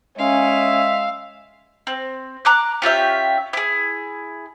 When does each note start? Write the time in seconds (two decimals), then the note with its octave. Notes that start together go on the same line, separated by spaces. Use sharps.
0.19 G#3 C#4 E5 F5
1.87 C4
2.45 A#5 D6 F#6
2.82 C#4 F4 G4 E5
3.53 E4 G#4